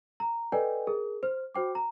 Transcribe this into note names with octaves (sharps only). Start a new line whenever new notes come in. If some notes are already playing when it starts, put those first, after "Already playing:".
A#5
A4 B4 D5 D#5 G5 G#5
G#4 A#4
C5 F6
F#4 C5 G5 D6
A#5